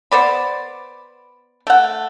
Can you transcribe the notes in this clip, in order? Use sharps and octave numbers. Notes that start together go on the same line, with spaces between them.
B3 C5 D5 B5
A3 F#5